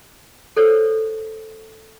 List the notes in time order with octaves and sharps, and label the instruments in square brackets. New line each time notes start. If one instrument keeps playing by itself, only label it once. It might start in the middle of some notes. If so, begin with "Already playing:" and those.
[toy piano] A4 C5 C#5